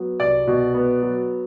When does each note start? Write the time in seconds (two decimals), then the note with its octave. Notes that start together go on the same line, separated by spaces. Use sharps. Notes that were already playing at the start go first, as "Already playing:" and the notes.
Already playing: F#3 B3
0.20 C2 D5
0.47 B2
0.74 B3
1.02 F#3